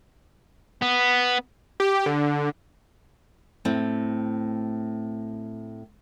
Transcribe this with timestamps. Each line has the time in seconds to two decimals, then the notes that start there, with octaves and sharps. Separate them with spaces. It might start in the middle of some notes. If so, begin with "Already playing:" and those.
0.82 B3
1.80 G4
2.06 D3
3.65 A2 C4